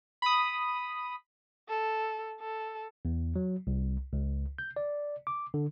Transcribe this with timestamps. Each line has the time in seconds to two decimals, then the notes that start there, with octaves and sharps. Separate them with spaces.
0.22 B5 D#6
1.69 A4
2.40 A4
3.05 E2
3.36 F#3
3.67 C2
4.13 C#2
4.58 G6
4.76 D5
5.27 D6
5.54 D3